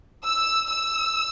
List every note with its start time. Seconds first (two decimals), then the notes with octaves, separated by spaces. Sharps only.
0.24 E6
0.70 E6